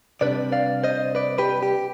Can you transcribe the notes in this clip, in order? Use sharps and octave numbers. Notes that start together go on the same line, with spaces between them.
C3 G3 D4 B4 D5
D5 F5
C5 D#5
B4 D5
G4 B4
G4